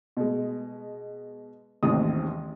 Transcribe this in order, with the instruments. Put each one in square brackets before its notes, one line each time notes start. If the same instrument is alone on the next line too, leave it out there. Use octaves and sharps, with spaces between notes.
[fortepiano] B2 G#3
A1 D#2 G#2 C3 D#3 D#6